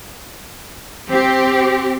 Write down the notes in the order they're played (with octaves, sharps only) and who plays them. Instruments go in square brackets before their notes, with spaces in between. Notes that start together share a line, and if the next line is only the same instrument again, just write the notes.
[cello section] C4 G4